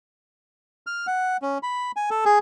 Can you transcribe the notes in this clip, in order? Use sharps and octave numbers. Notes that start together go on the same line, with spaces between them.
F6
F#5
C#4
B5
G#5
A4
G#4